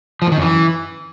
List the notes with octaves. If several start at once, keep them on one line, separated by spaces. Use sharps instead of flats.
F3
A2
D#3
F#2
E3